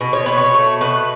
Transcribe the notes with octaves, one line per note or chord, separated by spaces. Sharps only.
B2
C#5
B2 B4
C#5
A3
B2 B4